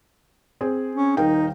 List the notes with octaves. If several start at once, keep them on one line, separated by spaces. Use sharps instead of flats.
C4 G#4
C#4
D#1 D#4 A#4 G5